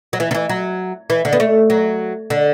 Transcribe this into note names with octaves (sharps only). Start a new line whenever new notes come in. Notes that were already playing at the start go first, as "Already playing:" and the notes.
F#3
E3
D3
E3
F#3
E3
D3
B3
A3
F#3
D3